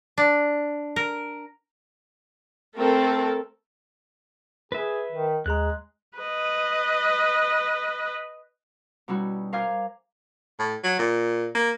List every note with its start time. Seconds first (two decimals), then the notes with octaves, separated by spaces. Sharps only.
0.18 D4
0.96 A#4
2.76 A3 C4 A4 A#4
4.72 G#4 B4 E5
5.12 D#3
5.46 D#2 G#3 G#4 A#5 F#6
6.18 B4 D#5
9.08 B2 G3 C#4 D#4 E4 F#4
9.53 A#4 C5 F5 G#5 D6 F6
10.60 A2
10.84 F#3
10.99 A#2
11.55 A#3